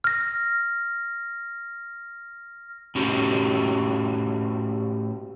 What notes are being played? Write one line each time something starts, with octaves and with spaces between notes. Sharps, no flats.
F6 A#6
A2 C#4 F#4 G4